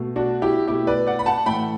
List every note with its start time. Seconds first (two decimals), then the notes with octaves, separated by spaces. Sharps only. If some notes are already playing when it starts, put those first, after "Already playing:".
Already playing: B2 A3
0.16 D4 F#4
0.42 E4 G4
0.67 B2 A3 E4 G4
0.87 B4 D5
1.07 D5 F#5
1.19 B5
1.26 F#5 A5
1.46 A2 E3 A3 G5 B5